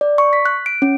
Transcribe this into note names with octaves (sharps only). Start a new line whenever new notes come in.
D5
C#6
B6
F#6
D7
C#4